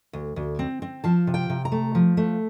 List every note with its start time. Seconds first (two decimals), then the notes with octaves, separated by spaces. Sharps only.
0.13 D2
0.36 D2
0.59 C4
0.82 C4
1.04 F3 A5
1.27 C3
1.34 G5
1.50 C3
1.65 A#5
1.72 A3
1.95 F3
2.17 A3